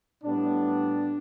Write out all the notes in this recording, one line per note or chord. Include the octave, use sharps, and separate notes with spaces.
A2 G3 B3 D4